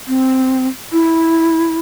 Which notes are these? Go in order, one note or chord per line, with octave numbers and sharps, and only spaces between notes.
C4
E4